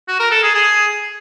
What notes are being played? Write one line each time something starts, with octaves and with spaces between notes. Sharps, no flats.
F#4
A#4
A4
G#4
G#4